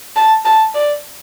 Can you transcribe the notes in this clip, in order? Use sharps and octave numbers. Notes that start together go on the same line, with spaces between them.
A5
A5
D5